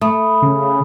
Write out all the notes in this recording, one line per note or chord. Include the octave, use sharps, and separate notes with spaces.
A3 B5 D#6
C#3